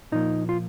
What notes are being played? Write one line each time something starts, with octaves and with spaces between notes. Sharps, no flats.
A#2 F3 A#3 D#4
F4